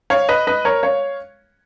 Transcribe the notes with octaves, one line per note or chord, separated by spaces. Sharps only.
C#5 F5
B4 D#5
B4 D#5
A#4 C#5
C#5 F5